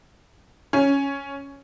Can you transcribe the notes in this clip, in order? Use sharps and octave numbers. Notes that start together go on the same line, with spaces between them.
C#4